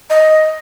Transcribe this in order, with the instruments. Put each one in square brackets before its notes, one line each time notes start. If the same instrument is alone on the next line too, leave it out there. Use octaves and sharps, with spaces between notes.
[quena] D#5